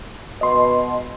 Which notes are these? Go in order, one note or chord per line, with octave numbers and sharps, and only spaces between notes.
B2 D#5 C6